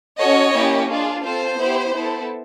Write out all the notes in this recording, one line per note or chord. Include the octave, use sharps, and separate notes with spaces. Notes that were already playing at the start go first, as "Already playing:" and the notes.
C#4 F#4 A4 C#5 D#5
A#3 C#4 E4 G4
D4 F4 G#4
C4 F4 A4 C5
B3 E4 G4
B3 E4 A4